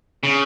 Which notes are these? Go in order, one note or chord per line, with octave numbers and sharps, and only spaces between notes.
C#3